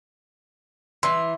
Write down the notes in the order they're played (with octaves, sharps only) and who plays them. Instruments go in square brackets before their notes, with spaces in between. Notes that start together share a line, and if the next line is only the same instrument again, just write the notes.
[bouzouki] E3 [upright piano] C6